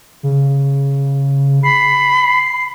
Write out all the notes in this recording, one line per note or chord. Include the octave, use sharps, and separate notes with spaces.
C#3
B5 C7